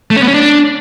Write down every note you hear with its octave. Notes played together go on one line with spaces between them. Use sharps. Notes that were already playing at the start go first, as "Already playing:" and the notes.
A3
C#4
B3
C#4
D4